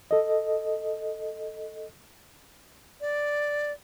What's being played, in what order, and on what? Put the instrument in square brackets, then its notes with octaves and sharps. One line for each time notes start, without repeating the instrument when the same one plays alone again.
[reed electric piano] A4 D#5
[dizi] D5